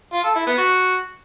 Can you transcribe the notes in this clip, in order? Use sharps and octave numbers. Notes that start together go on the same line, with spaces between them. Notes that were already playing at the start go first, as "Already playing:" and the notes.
F4
A4
E4
B3
F#4